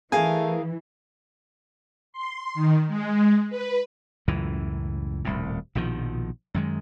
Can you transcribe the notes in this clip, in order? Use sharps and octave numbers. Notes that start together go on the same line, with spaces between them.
E3 A3 G#4 A#4 F5 G#5
C6
D#3
G#3
B4
C#2 F#2 A2 E3
D#1 C2 A2
A#1 B2 D#3 F3
F#2 D#3 G#3